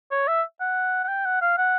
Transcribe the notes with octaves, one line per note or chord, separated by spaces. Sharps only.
C#5
E5
F#5
F#5
G5
F#5
F5
F#5